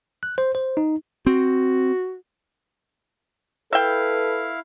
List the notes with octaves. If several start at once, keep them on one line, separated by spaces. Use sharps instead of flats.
F#6
C5
C5
D#4
C4 F#4
E4 A4 B4 E5 F5 G5